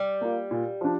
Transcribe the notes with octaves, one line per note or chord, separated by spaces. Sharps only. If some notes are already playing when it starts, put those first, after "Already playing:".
Already playing: G3
A#3 F4
A#2
F3 D4